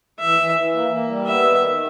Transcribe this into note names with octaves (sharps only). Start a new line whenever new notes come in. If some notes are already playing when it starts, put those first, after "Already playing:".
E3 E5
E3
E3
A#3
A#3
G3
B3 E5
D#3
D#3